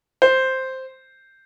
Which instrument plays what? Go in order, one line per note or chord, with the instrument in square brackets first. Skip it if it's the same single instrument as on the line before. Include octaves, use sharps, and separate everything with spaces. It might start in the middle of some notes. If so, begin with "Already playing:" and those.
[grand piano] C5